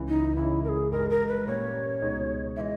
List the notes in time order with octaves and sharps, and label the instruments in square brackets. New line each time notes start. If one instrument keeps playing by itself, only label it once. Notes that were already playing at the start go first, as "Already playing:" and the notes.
Already playing: [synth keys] C#2 C#3 E3
[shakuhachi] D#4
[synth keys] C#2 C#3 E3 [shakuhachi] E4
[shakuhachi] A#4
G#4
[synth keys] G1 G2 E3 G#3 [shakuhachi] A#4
[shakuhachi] A#4
B4
[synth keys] A#2 G3 A#3 C#4 [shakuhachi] C#5
[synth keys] C#2 B2 G#3 D#4
[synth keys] E3 G#3 [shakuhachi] D#5 E5